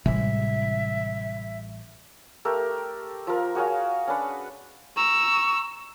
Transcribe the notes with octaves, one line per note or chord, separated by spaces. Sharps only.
A1 C3 E3 G3 G#3 E5
A3 G4 A#4
F3 A#4
F#4 G#4 C#5 F5
C#4 D4 B4 F#5
A#5 C#6 E6